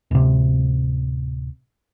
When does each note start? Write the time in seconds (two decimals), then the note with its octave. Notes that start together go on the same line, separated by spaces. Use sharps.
0.11 D1 C3